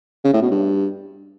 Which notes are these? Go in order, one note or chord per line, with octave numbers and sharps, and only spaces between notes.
C#3
A2
B2
G2